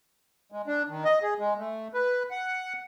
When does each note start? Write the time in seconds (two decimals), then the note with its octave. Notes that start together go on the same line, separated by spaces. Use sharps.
0.52 G#3
0.67 D4
0.89 D#3
1.05 D#5
1.23 G#4
1.39 G#3
1.58 A3
1.94 B4
2.31 F#5